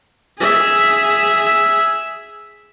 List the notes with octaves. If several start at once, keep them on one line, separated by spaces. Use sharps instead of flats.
G#4 E5